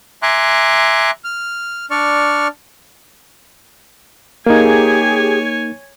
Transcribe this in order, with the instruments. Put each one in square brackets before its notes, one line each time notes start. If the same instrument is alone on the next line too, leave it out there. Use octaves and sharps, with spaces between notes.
[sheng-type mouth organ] E5 G#5 A#5 C6 D6 F#6
F6
D4 D5 C#6 F6
[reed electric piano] A#3 D#4 [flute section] G4 G#4 [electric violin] C#5 G#5